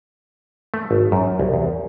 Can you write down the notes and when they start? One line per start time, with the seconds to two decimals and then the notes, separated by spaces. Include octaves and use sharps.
0.74 A3
0.91 G#1
1.12 F#2
1.40 C2
1.54 E2